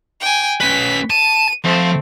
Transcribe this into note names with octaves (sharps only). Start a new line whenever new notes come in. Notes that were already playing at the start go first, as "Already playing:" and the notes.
G5 G#5
C#4 B4 B6
A5 D#7
F3 A3 C4